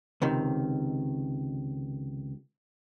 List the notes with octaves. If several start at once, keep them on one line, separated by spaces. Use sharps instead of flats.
C#2 C3 D#3